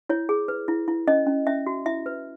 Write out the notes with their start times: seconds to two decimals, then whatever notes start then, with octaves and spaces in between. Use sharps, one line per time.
0.09 E4 C#5
0.29 G#4
0.48 B4
0.68 E4
0.88 E4
1.07 C#4 D#5
1.27 C#4
1.47 C#4 E5
1.67 F#4
1.86 E4 E5
2.06 B4